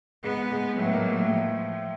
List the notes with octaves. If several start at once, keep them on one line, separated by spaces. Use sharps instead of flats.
G#2 G#3 B3
G#2 G#3
A2 F#3 A3
B3
A#2 A#3
A2 A3
F3